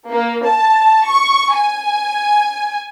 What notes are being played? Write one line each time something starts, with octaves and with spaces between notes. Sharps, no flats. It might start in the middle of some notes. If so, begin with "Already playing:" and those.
A#3
A5
C#6
G#5